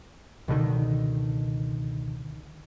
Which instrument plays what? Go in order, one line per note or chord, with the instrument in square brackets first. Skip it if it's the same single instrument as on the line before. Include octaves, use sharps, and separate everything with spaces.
[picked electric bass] C#2 B2 D3 D#3